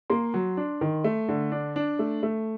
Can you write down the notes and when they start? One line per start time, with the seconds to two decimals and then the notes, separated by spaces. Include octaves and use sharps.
0.10 A#3 C6
0.34 F#3
0.57 D4
0.81 D#3
1.04 A3
1.29 D3
1.52 D4
1.76 D4
1.99 A3
2.23 A3